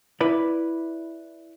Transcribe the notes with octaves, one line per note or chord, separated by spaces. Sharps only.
E4 B4 D5